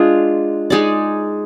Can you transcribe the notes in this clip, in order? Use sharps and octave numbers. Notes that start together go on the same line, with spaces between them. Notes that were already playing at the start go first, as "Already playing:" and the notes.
Already playing: G#3 D4 F4 G#4
G#3 D#4 G#4 D5